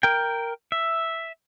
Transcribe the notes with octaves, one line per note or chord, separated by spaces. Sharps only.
A#4 G5
E5